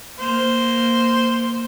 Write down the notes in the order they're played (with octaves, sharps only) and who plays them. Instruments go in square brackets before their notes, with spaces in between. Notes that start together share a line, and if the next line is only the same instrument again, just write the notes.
[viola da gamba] A#3 [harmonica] C5